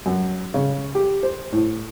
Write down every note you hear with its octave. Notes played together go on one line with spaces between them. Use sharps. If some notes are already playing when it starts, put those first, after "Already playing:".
F#2
C#3
G4
C5
A2